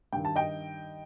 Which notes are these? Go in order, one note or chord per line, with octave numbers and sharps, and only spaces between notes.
G2 D#3 G5
A5
D#5 G5